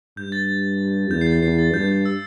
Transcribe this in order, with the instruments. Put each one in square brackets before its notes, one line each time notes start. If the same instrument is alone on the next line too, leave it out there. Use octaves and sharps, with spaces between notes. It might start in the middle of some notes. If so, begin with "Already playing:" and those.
[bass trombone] G2 [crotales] G6
[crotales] A6
[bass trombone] E2 [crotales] G6
[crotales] C7
A6
[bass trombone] E2 [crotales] C7
[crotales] A6
[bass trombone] G2 [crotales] G6
[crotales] G6
E6